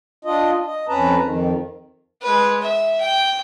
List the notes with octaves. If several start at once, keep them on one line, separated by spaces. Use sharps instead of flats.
D4 F4 D#5
D#5
F2 C#4 B4 A5 A#5
F2 D#3
G#3 B4
E5
G5